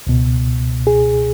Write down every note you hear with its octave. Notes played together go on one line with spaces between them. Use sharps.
C#2 B2
G#4